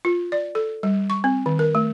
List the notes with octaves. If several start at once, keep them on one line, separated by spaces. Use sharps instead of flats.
F4
D5
A4
G3
C#6
C4
D#3
A#4
A3